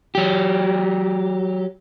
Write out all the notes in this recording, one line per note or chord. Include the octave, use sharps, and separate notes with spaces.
F#3 G4